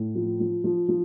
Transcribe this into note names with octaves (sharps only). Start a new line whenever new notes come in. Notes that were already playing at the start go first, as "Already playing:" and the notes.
Already playing: A2
F3
F3
F3
F3